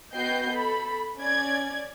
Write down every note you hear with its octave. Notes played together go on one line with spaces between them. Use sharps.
B3 F#4 D#5 G5 G6 C7
A4 B5
C#4 D5 G#6